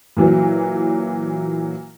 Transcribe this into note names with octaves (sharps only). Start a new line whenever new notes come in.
A#2 E3 F#3